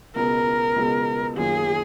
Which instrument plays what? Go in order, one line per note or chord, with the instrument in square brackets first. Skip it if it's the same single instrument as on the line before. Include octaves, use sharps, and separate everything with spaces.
[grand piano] C#2 B2 G#3 B3 [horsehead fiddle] A#4
[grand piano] C#2 B2 G#3 B3
[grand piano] F#2 D#3 A#3 C#4 F4 [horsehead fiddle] G#4